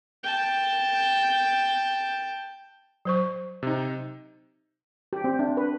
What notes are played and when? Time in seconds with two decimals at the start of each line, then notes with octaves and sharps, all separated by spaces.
0.23 G5 A5
3.05 F#3 C5 C#6
3.63 C3 D#4
5.13 G4
5.24 C4
5.39 D4
5.57 B4